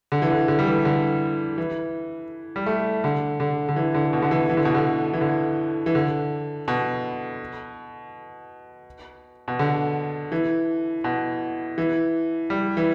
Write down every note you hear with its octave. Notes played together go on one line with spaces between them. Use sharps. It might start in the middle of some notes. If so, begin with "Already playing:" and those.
D3
E3
D3
D3
G3
E3
D3
E3
G3
A3
D3
D3
D3
E3
D3
B2
D3
E3
E3
D3
B2
D3
E3
D3
E3
D3
B2
B2
D3
E3
B2
E3
G3
E3